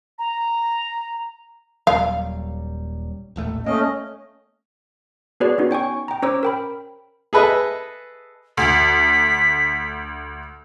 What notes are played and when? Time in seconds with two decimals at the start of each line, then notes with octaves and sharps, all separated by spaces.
0.19 A#5
1.87 D#1 F#3 G3 F5
3.36 D#1 A1 A3
3.66 A3 A#3 C#4 D#5
5.40 B3 F#4 G#4 B4 C#5 D5
5.58 B3 C#4 D#4 F#4
5.71 C#5 G5 G#5 C#6
6.08 G5 A#5
6.22 C#4 C5 C#5 A#5 D6 E6
6.43 A#4 G5 B5
7.33 G#4 A4 B4 D#5 E5
8.57 D2 B6